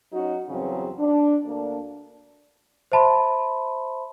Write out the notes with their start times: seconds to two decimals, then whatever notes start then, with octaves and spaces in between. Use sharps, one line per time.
0.12 F#3 C#4 D#4 F#4
0.49 E2 G2 C#3 F#3 C4
0.99 D4
1.43 D2 A#3 D4
2.92 C5 E5 A5 B5 C6